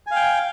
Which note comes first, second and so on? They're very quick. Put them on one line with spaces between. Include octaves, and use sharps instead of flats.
G#5 F5 G5